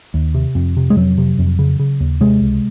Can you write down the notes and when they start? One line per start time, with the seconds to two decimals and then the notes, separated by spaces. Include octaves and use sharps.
0.14 D#2
0.35 C3
0.55 F2
0.77 C3
0.90 G#3
0.96 F2 F#3
1.18 C3
1.39 F2
1.59 C#3
1.80 C#3
2.00 D#2
2.21 C3 G#3
2.41 C#2